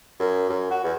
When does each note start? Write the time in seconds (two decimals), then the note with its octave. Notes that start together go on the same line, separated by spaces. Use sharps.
0.19 F#2
0.49 F#2
0.70 F#4
0.84 E2